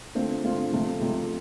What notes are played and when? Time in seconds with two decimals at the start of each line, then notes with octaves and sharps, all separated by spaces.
0.15 D3 A3 C4 F4
0.44 D3 A3 C4 F4
0.72 F2 C3 A3 F4
1.01 F2 C3 A3 F4